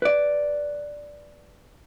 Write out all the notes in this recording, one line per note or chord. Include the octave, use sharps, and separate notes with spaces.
B4 D5